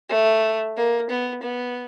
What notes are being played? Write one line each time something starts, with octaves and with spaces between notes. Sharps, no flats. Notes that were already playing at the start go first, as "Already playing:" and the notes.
A3
A#3
B3
B3